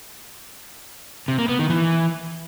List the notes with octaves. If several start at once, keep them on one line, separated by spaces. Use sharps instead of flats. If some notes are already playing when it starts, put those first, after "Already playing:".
C3
A#3
B3
D#3
E3